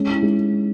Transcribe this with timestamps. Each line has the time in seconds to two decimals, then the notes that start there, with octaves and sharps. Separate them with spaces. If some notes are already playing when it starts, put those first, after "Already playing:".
Already playing: G#3 C#4
0.08 E4
0.23 G#3